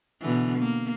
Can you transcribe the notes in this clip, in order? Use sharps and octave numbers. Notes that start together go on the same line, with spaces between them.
B2 D3 E3
A#3